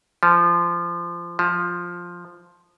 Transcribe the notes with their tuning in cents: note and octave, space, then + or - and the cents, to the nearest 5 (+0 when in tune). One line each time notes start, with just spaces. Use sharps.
F3 -20
F3 +5